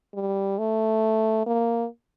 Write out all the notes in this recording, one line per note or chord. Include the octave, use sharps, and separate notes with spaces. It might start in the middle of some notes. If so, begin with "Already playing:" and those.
G3
A3
A#3